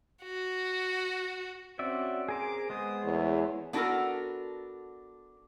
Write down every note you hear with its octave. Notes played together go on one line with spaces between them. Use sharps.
F#4
C4 C#4 F#4 D5 E5
G#4 A#4 C5 D6
G#3 B3 C5 D#6
E2 A3 C#5
B3 D4 F#4 G4 A4 A#4